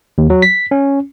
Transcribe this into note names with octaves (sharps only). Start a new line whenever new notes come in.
D#2
F#3
B6
C#4